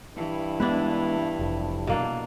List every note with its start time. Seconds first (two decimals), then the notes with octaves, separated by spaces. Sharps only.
0.16 G2 E3
0.60 G#3 B3 D4 E4 B4
1.39 F1
1.87 B2 A#3 D4